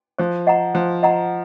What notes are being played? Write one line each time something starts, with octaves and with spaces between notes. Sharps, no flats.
F3 C5
D#5 F#5 A#5
F3 C5
D#5 F#5 A#5